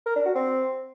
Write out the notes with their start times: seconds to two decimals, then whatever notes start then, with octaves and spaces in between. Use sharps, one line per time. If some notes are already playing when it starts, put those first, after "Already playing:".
0.06 A#4
0.16 D4
0.26 F#4
0.35 C4